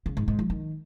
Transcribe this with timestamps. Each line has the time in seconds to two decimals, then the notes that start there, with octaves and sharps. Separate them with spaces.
0.06 C#3
0.17 G#2
0.28 G#2
0.39 F3
0.50 D#3